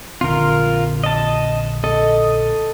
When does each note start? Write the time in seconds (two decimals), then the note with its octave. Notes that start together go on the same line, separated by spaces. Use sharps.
0.21 A#1 D3 C4 F4 A#4
1.04 D#5 A5
1.84 A4 D#5